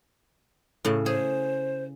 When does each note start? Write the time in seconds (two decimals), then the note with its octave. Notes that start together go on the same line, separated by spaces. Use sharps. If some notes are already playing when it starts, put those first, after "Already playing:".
0.85 A2 C#3
1.06 G#4 C5